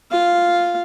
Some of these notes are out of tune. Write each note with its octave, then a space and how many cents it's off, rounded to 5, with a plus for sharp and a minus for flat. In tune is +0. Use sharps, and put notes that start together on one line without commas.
F4 +0 F5 +0